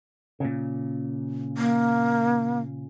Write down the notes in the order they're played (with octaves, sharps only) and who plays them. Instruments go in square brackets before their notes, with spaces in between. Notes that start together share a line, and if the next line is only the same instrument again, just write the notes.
[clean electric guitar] A#2 C#3
[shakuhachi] A#3